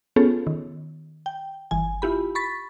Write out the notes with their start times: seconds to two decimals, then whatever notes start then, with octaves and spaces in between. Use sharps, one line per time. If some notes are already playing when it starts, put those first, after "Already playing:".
0.16 B3 C#4 F4 G#4 A4 C#5
0.47 D#3
1.26 G5
1.71 G1 E3 G#5
2.02 E4 F4 G4 B5
2.35 B5 C#6 A6 B6